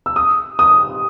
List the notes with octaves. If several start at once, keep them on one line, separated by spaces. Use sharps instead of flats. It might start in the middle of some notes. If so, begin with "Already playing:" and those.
E6
D#6
D#6